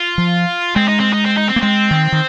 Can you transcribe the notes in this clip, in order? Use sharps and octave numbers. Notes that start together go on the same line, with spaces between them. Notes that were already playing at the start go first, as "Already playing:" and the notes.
Already playing: F4
F3
G#3 C4
D#4
C4
D#4
C4
D#4
C4
A#3
G#3 C4
D#3
D#3